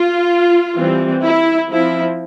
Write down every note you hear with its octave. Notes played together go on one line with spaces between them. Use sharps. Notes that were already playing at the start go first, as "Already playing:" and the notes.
Already playing: F4
E3 G3 C4
E4
F3 C4 E4